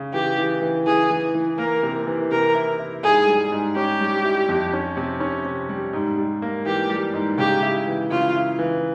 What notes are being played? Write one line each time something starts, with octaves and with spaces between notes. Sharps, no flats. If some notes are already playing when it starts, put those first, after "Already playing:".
Already playing: C#3
E3 G4
E3
E3
E3 G#4
E3
E3
A#3 A#4
C3
E3
C3 A#4
E4
E4
G#2 G#4
G3
G#2
C#4 G4
G3
E4
F2
C#4
C3
C#4
C3
G3
G#2
G3
A#3
E3 G4
G3
G#2
C#3 G4
E4
E3
C#3 F4
E4
E3